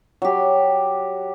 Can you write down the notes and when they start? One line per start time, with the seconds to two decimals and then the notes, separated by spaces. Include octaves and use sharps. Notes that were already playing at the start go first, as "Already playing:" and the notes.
0.22 F#3 G4